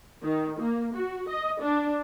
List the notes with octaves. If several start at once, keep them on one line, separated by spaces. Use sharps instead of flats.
D#3
A#3
F#4
D#5
D4